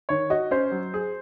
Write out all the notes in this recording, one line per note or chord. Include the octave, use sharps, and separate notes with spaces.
D#3 C#5
F#4 D#5
C#4 C5
F#3
G#4